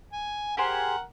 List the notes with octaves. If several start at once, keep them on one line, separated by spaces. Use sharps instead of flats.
G#5
G4 G#4 A#4 C5 F#5